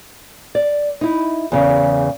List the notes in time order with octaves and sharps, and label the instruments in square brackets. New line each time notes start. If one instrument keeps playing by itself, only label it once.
[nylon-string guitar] D5
D#4 E4
E2 C#3